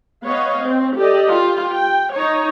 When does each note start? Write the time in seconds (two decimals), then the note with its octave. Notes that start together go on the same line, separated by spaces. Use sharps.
0.25 B3 C#5 D#5 F5
0.62 C4
0.98 G4 A4 D5 D#5
1.33 F4 G4
1.74 G5
2.16 D#4 C#5